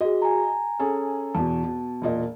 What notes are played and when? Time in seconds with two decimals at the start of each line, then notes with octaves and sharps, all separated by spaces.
0.01 F#4 G#4 D#5
0.22 G#5 A#5
0.79 C#4 G#4 A4
1.35 E2 B2 A5
1.64 B2
2.02 E1 A#2 D#5